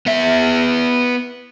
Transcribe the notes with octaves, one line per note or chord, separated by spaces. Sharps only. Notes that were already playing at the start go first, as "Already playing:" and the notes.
B3 E5